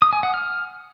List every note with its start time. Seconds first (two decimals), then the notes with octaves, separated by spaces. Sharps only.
0.02 D#6
0.13 G#5
0.23 F#5
0.34 F6